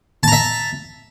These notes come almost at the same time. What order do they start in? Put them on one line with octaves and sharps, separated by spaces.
A5 A#5 E5